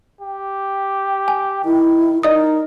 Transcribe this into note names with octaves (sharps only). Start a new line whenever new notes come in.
G4
G#5
D#3 E4
D#4 A#4 D5 D#5 D#6